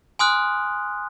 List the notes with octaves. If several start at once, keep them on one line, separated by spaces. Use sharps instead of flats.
G#5 C6 D#6 F6 F#6